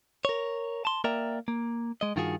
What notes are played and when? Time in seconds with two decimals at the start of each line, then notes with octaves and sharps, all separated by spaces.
0.25 A#4 C#5
0.85 A5 C6
1.04 A#3 A#4 D5 E5 G5 A#5
1.48 A#3
2.01 G#3 D#5
2.16 G2 D#3 F4 F#4 G#4